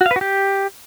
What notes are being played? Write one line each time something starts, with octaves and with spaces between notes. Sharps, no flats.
F#4
F5
B4
F#4
G4